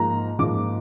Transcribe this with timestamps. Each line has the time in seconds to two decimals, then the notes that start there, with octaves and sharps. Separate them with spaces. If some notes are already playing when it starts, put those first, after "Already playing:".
Already playing: G#2 F3 A#3 A#5
0.39 G#2 F3 A#3 D6